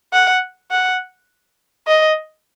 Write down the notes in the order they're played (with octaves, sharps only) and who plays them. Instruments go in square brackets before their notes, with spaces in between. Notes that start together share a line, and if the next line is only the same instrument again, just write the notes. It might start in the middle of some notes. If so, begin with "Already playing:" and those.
[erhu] F#5
F#5
D#5